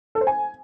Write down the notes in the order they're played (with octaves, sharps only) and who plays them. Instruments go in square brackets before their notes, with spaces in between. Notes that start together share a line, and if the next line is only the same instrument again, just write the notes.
[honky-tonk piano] A4
C5
G#5